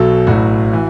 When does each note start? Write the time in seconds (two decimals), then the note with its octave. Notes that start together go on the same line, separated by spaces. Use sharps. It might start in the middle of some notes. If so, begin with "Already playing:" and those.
Already playing: B1 B2 F#3 A4
0.27 A1 A2 F#3 F#4
0.73 E3